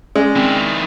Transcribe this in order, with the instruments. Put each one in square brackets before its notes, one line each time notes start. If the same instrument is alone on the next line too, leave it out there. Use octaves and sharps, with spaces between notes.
[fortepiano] G#3 [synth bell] C#4 [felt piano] D5
[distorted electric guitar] D#3 E4 [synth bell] C4